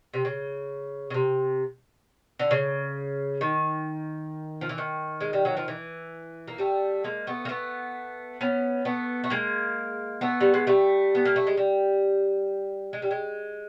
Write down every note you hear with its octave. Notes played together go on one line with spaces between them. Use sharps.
C3
C#3
C#3
C3
D3
C#3
D#3
F3
E3
D#3
G#3
G3
F#3
F3
E3
A#3
G3 A3
G#3 A#3
A3 B3
A#3
A3 B3
B3 C#4
A3 B3
A3
G#3 A#3
A3 B3
G3
G#3
G3 A3
B3
A#3
A3
G#3
G3
G#3
G3
G#3